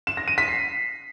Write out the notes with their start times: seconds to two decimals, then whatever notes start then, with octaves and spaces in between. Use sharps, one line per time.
0.07 E7
0.17 A#6
0.28 D#7
0.38 B6
0.48 C7